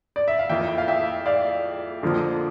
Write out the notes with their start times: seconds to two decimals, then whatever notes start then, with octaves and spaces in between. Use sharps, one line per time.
0.16 D5
0.28 E5
0.39 F5
0.49 F2 E3 A#3 E5 G5
0.78 F5
0.88 E5 G5
1.26 D5 F5
2.03 F2 D3 F3 A#3